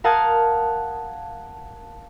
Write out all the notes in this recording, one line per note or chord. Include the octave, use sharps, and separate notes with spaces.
A#4 F5 F#5 A5 D#6 G#6